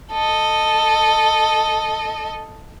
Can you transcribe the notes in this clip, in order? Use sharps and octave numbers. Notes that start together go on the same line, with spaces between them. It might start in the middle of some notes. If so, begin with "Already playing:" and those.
A4 D#5